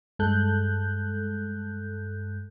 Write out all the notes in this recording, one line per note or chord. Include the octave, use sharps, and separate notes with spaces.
G2 G#3 A4 F#6 G6